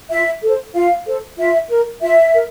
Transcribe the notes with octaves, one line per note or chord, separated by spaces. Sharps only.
F4 E5
A4 C5
F4 F5
A4 C5
F4 E5
A#4
F4 E5
A#4